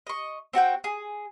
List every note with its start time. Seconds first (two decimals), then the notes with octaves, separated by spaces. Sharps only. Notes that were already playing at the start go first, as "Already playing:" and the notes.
0.07 D#5 C#6
0.53 C4 F#4 F#5 G5
0.84 G#4